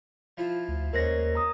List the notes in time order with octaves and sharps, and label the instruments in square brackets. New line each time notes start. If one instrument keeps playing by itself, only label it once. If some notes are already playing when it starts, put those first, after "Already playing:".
[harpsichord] F3 E4 F4
[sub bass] D2
[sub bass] D#2 [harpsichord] G#3 C#4 [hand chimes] A#4 C5 A#6
[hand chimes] A#5 D#6